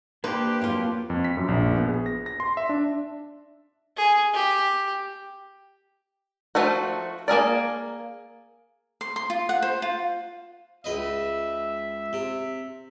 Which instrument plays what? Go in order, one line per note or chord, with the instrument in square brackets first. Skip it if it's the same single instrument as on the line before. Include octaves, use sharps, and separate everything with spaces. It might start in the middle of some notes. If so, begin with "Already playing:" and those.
[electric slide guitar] A#3 [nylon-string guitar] D4 C5 [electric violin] G4 [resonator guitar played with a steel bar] B4
[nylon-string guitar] F2 F#3 F4
[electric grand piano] F2
B6
F#2
A#1
B3
G#4
A#6
A#6
C6
E5
D4
[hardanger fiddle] G#4
G4
[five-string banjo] F3 A3 D#4 F#4
A#3 G#4 A#4 D5
[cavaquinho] C6
C6
F4
F#5
C5
F4
[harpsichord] C#2 B4 D#5 [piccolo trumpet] E5
[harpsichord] C3